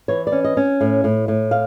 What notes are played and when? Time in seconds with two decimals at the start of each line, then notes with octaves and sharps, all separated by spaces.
0.08 E3 C#5
0.27 D5
0.32 C#4
0.44 D#5
0.57 C#4
0.81 A2
1.04 A2
1.28 A2
1.51 F5